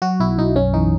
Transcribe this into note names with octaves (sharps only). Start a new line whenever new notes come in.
F#3 F#4
B1 E4
B1 D#4
F#2 C#4
E3 D#4